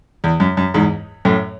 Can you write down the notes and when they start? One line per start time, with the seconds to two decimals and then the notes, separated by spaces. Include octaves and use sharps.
0.24 E2
0.40 F#2
0.57 F#2
0.74 E2 G#2
1.25 F#2 A2